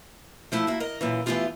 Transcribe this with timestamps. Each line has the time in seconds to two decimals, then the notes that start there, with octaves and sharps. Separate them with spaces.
0.52 F3 A3 E4
0.67 A#3 E4 F#4
0.80 A#4 D#5
1.01 F#2 A#2 E3
1.26 E3 A3 B3 D4 F4 G4